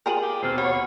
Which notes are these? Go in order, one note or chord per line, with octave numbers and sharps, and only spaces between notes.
F4 G#4 A#4 G5 D#7 F#7
G4
D#2 B2 C4 F5
G4 C#5 F#5 B5 F6